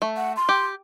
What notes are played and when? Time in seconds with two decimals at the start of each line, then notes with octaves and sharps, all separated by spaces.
0.02 A3
0.17 F#5
0.37 C6
0.49 G4